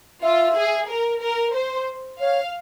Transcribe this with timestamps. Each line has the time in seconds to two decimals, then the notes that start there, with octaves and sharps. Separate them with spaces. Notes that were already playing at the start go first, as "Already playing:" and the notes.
0.22 F4 E5
0.55 G#4
0.89 A#4
1.22 A#4
1.55 C5
2.20 C#5 F5